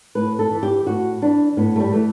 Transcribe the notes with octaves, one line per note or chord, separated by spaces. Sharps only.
A2 B4
A4
E3
G4
A2 F#4
E3 D4
A2 B3
A3
G3
E3 A3